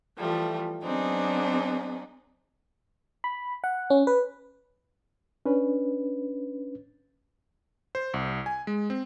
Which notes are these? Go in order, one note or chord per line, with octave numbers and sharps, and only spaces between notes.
E3 F3 G3 A3
F#3 B3 C4 D4 D#4 G#4
B5
F#5
C#4
B4
C#4 D4 B4
C5
C2
G#5
G#3
C4